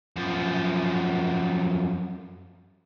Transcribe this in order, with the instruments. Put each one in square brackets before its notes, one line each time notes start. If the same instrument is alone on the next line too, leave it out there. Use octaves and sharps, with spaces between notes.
[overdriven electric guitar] F#2 F3